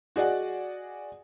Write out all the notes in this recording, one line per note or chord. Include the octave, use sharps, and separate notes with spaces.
F#4 G#4 D5 D#5 F#5